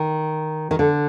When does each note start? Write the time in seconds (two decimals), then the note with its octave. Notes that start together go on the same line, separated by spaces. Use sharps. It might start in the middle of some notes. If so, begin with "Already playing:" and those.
Already playing: D#3
0.71 D#3
0.79 D3